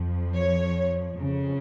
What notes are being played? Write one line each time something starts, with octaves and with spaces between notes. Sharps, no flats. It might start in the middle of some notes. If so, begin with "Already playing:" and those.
Already playing: F2 F3
C#5
F2 C#3 F3